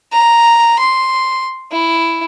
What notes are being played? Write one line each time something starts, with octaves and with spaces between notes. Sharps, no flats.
A#5
C6
E4